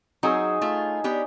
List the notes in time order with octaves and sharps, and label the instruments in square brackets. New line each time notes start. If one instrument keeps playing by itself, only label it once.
[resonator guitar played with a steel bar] F#3 C4 F#4 [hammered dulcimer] D#4 G#4 C#5
[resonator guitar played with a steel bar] A3 F4
B3 D4 G4